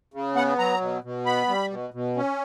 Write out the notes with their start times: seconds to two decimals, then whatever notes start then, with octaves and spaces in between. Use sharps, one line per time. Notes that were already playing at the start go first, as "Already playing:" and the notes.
0.14 C#3
0.36 B3 F#5
0.59 F#3 A#5
0.81 B2
1.04 B2
1.26 B3 B5
1.48 G3
1.71 B2
1.94 B2
2.16 C#4